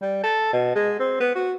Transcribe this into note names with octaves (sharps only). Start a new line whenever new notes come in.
G3
A4
B2
G#3
C4
B3
F#4